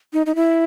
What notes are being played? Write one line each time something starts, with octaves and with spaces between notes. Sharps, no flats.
D#4
D#4
E4